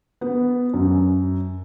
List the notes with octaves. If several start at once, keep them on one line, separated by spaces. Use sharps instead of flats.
B3
F#2